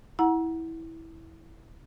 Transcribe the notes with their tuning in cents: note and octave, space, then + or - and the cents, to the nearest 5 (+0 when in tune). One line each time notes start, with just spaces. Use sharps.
E4 -15 F#5 +0 A#5 +30